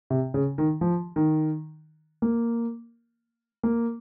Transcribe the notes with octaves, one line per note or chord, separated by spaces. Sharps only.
C3
C#3
D#3
F3
D#3
A#3
A#3